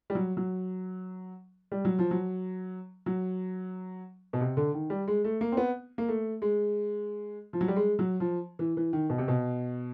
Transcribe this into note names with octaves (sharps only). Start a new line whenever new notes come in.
G3
F#3
F#3
G3
F#3
F3
F#3
F#3
B2
C3
D3
D#3
G3
G#3
A3
A#3
C4
B3
A#3
A3
G#3
F3
F#3
G3
G#3
F#3
F3
E3
E3
D#3
B2
C3
B2